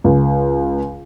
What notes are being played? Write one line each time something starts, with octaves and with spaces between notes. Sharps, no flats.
C#2